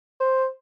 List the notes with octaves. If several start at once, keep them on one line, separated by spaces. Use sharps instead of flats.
C5